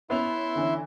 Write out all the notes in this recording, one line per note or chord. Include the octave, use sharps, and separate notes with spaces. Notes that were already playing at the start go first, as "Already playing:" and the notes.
B3 C#4 E4 E5 C6 F7
D3 E3 C#4